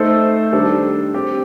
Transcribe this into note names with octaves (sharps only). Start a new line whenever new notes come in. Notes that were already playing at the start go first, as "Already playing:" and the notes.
Already playing: A3 D#4 A4 C5
D#3 G3 D4 A4 C5
C4 G4 C5